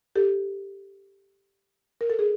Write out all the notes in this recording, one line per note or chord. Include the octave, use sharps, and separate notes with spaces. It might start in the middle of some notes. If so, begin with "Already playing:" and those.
G4 A4
A#4
A4
G#4